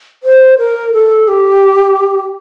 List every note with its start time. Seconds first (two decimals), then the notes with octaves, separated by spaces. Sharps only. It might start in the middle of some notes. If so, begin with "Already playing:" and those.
0.23 C5
0.58 A#4
0.94 A4
1.28 G4